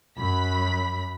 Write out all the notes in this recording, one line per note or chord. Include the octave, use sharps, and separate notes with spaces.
F#2 B5 B6